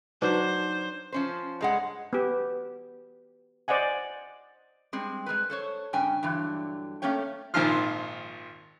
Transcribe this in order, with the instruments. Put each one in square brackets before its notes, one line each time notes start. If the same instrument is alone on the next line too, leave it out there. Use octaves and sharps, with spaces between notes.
[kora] F#3 D4 [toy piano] D#4 B4 [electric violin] C5
[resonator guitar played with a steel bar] F3 C#4 C5
G2 G#3 F#5
[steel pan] B3 G4
C5 D5 D#5 F#5 G#5
[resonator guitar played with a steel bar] G3 G#3 C4
G#3 G#4 A#4 B4
A4 C5 C#5
G2 C#3 G5 G#5
G2 D3 E3 F#3
A3 A#3 C#4 A4 C#5 G5
[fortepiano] G#1 A#2 D#3 F3 F4 F6